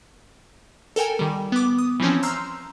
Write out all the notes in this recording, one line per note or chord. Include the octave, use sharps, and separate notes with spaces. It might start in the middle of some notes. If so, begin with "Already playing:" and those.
A4 A#4 G5 G#5
D#3 G3
B3 D6
D#6
E3 F3 C4 C#4
A#5 C6 E6 F6 G6 C7